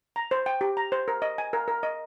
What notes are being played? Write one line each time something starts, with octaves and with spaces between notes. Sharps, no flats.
A#5
C5
G5
G4
A#5
C5
A#4
D#5
G#5
A#4
A#4
D#5